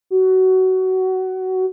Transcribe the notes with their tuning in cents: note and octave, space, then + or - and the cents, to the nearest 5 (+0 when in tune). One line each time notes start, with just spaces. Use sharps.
F#4 +20